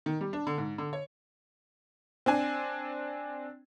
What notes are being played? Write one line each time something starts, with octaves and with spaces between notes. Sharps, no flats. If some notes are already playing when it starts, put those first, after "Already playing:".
D#3
G3
D4
D3
G#2
D3
C#5
C4 D4 G#5